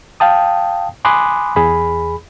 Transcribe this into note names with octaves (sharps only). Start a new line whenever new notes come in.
F5 G5 A5 D#6
G#5 B5 C6 D6 D#6 F#6
E2 G#4 B5